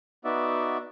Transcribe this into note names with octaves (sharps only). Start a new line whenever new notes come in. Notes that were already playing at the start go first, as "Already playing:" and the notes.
B3 D#4 F#4 D5 E5